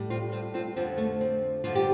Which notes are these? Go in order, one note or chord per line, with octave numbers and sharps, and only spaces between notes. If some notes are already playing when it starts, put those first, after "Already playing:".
Already playing: A2 G3
C4 F4
C4 F4
C4 F4
F2 D3 F3 C4
A3
C4
G2 D3 F3 F4
G4